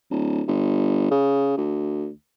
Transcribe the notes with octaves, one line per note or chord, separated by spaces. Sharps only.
D1
G1
C#3
D2